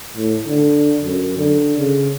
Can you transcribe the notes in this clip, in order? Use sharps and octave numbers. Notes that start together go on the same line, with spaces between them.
A2
D3
F#2
D3
C#3